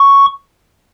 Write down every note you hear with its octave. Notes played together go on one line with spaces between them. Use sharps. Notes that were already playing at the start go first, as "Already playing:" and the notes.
Already playing: C#6